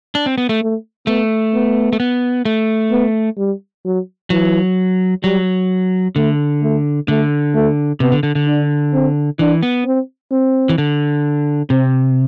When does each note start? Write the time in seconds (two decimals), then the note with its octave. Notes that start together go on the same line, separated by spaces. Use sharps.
0.15 D4
0.26 C4
0.38 B3
0.49 A3
0.61 A3
1.07 A3 B3
1.54 B3
1.93 A3
2.00 B3
2.45 A3
2.92 B3
3.38 G3
3.85 F#3
4.30 E3 F#3
5.23 F#3 G3
6.16 D3 A3
6.63 A3
7.08 D3 A3
7.55 A3
8.00 C3 B3
8.12 D3
8.23 D3
8.35 D3
8.47 D4
8.93 C4
9.39 E3 D4
9.63 B3
9.85 C4
10.32 C4
10.69 E3
10.78 D3
11.70 C3 C4